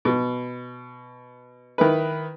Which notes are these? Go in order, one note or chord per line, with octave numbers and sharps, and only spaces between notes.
B2
D#3 E4 B4